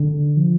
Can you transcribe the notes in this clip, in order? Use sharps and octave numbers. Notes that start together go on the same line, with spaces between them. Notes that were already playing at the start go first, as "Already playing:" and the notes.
Already playing: D3
F3